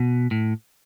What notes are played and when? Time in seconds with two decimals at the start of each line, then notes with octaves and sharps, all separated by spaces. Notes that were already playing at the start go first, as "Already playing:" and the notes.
Already playing: B2
0.31 A2